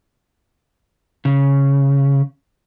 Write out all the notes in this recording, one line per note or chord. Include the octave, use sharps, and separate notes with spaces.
C#3